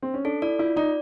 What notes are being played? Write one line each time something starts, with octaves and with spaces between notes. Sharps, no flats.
C4
C#4
D4 A4
E4 D5
E4 F4
D#4 D5